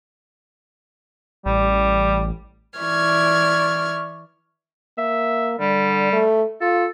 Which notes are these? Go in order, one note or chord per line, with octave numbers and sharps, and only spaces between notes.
A1 G3
E3 E4 D5 C#6 F6 G#6
A#3 E5
D3 G3
A3
F4 A4